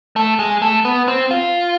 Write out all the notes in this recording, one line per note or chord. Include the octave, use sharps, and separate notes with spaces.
A3
G#3
A3
B3
C4
F4